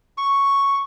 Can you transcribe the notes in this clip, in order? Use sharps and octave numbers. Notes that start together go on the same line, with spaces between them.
C#6